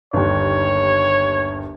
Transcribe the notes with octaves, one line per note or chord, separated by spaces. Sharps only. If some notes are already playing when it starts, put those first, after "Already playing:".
G1 D#2 C#5